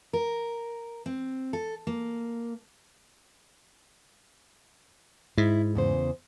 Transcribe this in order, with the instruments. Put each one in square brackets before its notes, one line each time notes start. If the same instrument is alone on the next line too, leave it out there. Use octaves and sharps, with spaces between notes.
[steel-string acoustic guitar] A#4
C4
A4
A#3
[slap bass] G#2 [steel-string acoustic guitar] E4
[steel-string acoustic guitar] E2 C#3 C5